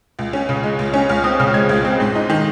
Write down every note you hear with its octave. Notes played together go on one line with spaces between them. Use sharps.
C#2
C#4
C#3
G#3
C#2
C#4
C#2 F6
C4 D#6
C#3 F6
G#3 G#6
C#2
C4
G#2
D#4
D#3